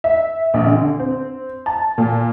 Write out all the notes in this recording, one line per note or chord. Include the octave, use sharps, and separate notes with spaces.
E5
A#1
D3
C4
A5
A#2